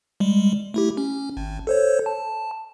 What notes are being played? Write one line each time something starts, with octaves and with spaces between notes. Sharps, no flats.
G3 G#3
A3 E4 G4
C#4
G#1
A4 C5 C#5
A5